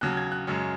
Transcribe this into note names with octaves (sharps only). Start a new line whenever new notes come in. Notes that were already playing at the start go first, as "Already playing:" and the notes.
D#2 C#3 F#3 F#6
G#6
F#6
F#2 C#3 G#3 C#4